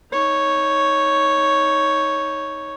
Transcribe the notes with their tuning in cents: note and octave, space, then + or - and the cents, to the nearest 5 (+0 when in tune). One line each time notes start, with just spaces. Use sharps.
D#4 +20 C#5 +0